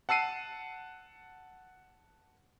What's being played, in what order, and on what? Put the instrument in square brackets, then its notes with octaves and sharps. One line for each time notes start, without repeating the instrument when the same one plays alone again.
[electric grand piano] F#5 A5 E6 C7 D#7